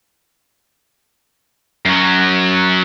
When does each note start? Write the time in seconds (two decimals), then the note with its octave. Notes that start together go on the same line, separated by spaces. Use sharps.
1.86 F#2 F#3